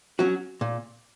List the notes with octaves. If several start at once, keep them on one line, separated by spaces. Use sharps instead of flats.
F#3 C#4 F#4
A#2